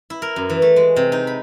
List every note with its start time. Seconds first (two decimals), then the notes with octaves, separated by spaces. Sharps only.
0.10 E4
0.22 A#4
0.36 F#2
0.50 E3
0.62 A3
0.76 G#3
0.96 C3
1.12 D#4
1.27 B5